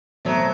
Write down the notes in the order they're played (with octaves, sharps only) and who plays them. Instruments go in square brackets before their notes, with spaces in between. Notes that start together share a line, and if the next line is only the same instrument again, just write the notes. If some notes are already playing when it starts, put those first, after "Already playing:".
[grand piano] B2 A3 C4 [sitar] F#3